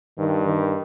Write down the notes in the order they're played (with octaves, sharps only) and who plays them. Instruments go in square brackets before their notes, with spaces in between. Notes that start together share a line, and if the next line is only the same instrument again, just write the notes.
[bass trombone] G2 [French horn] D#3
[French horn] D#3